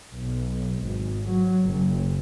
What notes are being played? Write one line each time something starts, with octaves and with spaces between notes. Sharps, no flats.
B1
G#1
F#3
F#1